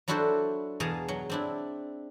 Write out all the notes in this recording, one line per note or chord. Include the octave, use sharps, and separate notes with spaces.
F#3 D4 E4 F#4 A4 C5
E2 B2 G#4 F5 A5 A#5
F#3
C4 D4 E4